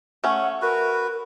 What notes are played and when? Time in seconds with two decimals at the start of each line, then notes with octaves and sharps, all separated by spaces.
0.24 A3 C#4 F#5
0.62 F#4 A#4 B4